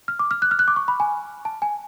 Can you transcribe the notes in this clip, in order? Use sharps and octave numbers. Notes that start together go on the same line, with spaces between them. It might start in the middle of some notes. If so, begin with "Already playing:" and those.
F6
D6
F6
F#6
F6
F#6
D6
C#6
B5
G#5
A5
G#5